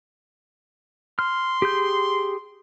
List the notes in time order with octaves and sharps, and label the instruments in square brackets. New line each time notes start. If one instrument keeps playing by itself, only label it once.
[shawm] C6 [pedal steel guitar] F6
[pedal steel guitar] G4 G#4 G6